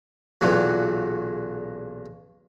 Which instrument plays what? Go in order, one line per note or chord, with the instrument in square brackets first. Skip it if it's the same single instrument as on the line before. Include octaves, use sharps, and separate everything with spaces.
[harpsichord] B1 E2 A#2 C#3 F#3